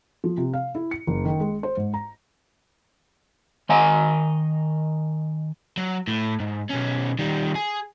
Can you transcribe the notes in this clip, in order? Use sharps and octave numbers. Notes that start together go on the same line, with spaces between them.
F3
C3
F5
E4
C#7
F#1
D#3
G#3
C5
G#2
A#5
D#3 D#5 G#5 A#5
F#3
A2
G#2
B1 C#4
D#3 G3
G#4